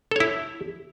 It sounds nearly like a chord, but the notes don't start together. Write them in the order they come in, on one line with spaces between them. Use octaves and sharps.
A4 C#5 E4